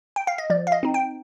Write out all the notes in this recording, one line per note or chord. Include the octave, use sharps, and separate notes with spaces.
G5
F5
D#5
F3 D5
F5
D#5
C4 D#4
G5